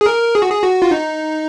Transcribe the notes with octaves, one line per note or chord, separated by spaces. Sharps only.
G#4
A#4
G#4
F#4
G#4
F#4
F4
D#4